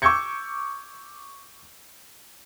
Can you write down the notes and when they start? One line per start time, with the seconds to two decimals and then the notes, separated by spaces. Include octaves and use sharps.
0.02 C#6 D6 E6 G6 G#6 C#7